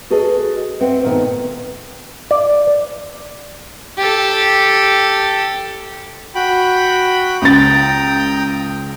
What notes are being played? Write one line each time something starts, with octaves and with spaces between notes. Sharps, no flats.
F#4 G#4 A4 B4 D#5
C4 B4 E5 F#5
A#2 D#3 A3 B3
D5
G4 A4
F#4 G5 B5
C#2 G5 A#5 D#6 A6